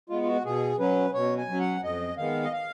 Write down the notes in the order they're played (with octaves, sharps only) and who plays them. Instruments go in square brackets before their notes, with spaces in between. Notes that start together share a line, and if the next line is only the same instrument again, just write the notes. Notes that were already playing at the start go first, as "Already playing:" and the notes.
[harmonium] G#3 B3 F4
F4
F#4
B2 G#4
F#3 C#4 B4
B2 C#5
G#5
F#3 C#4
F#5
F2 D#5
D#3 G#3 B3 F5
D#5
F5